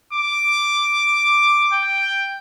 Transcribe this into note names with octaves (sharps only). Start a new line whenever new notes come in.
D6
G5